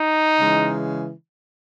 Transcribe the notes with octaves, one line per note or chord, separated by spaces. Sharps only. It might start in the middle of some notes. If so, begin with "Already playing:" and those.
Already playing: D#4
C#3 E3 G#3